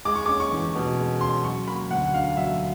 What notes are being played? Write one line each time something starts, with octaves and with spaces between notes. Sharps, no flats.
G#3 D6
C#6
D6
C#4
C#6
E2
B2
G#3
C#4 C6
F#3 C#6
A#3 B5
D2 F#5
D3 F5
F#3 E5